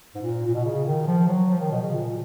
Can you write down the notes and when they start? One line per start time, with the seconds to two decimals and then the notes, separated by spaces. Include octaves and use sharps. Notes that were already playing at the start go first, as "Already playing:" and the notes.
0.15 G#2
0.22 A#2
0.46 A#2
0.54 B2
0.64 C#3
0.86 D#3
1.07 F3
1.28 F#3
1.50 F3
1.60 D#3
1.71 B2
1.82 C#3
1.92 A#2